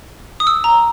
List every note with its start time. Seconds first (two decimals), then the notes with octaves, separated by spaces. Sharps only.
0.40 D#6
0.47 E6
0.64 A#5